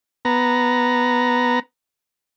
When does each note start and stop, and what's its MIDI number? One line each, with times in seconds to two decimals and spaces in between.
0.25 1.59 59
0.25 1.59 82